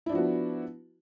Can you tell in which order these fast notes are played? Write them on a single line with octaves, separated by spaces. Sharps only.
E4 D4 F3 F#4 B3